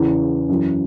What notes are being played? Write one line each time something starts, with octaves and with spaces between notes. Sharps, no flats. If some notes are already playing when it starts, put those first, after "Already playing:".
Already playing: E2 C#3 E3
F#2 E3